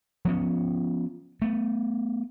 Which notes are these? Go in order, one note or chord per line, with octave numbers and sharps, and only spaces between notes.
F3 B3 C#4
A3 B3